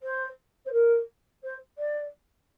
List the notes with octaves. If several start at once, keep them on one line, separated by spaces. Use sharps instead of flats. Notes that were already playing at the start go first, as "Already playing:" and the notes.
C5
C5
A#4
C5
D5